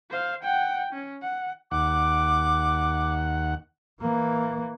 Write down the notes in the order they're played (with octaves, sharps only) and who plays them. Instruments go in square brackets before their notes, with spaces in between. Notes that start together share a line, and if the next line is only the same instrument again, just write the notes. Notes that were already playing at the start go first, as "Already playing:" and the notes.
[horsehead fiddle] C5 F5
F#5 G5
C#4
F#5
[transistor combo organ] D#2 F#5 [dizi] D6
[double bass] E3 A#3